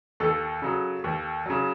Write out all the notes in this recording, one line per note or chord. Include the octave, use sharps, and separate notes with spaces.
D#2 A4
C#3 F#3
D#2
C#3 F#3